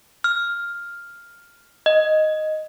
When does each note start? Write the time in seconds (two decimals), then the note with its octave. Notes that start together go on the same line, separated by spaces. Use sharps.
0.24 F6
1.86 D#5